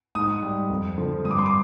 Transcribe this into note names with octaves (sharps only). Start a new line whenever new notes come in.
G#2 D#6
G3
F2
D3 F3
G2 D#6
D6
C6
D6